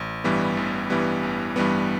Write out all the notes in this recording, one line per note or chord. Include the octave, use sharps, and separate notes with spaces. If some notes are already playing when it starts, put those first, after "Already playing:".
Already playing: A1
G2 E3 G3 B3
A1
G2 E3 G3 B3
A1
G2 E3 G3 B3